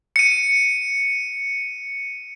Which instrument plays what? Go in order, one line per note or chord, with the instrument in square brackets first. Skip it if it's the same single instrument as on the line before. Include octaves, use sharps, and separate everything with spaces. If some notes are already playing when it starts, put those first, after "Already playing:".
[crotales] C#7 D#7